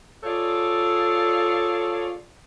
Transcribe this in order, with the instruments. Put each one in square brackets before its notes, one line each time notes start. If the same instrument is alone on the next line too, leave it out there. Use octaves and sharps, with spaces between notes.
[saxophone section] F4 G#4 A4 C#5 D5